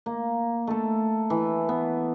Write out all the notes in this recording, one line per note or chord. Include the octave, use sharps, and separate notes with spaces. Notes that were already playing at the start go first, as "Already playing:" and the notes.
A#3
A3 A4
E3
B3